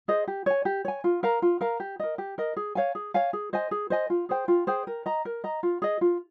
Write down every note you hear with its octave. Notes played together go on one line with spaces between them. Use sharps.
G#4 C5 D#5
G4
C#5 G#5
G4
C#5 G#5
F4
A#4 F5 A#5
F4
A#4 F5 A#5
G4
A#4 D#5
G4
A#4 D#5
G#4
C#5 F5 G#5
G#4
C#5 F5 G#5
G#4
C5 D#5 G#5
G#4
C5 D#5 G#5
F4
G#4 C5 G5
F4
G#4 C5 G5
A#4
D#5 A#5
A#4
D#5 A#5
F4
G#4 D#5
F4